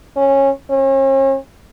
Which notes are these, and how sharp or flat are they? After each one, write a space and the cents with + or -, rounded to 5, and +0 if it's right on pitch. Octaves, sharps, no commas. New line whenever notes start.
C#4 -15
C#4 -40